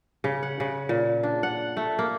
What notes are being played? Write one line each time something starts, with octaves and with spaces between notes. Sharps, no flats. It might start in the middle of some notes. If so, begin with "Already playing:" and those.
C#3
F#5
C#3
A#2
D4
F#5
A3
A#3